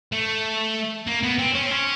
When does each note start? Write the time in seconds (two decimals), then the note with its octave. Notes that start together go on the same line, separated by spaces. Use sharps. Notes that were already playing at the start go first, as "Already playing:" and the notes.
0.12 A3
1.07 A#3
1.23 B3
1.38 C4
1.54 C#4
1.63 C4
1.71 C#4